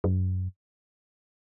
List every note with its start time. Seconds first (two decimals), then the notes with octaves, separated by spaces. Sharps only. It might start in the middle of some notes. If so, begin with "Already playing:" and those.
0.04 F#2